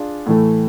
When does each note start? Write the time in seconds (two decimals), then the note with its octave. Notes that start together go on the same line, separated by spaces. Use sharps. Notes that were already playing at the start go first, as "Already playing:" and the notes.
Already playing: D4 F4 G#4
0.27 A2 E3 A3